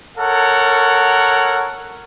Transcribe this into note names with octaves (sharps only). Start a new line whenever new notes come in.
A4 A#4 C#5 F#5